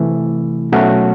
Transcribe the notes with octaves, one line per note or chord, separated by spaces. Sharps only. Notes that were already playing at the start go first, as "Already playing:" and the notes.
Already playing: C3 E3 A3
B2 F#3 A3 C#4 F#4